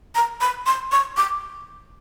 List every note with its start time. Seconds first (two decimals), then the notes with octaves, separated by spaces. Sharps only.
0.15 A#5
0.41 B5
0.66 C6
0.92 C#6
1.17 D6